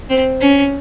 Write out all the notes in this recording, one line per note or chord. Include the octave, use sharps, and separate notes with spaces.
C4
C#4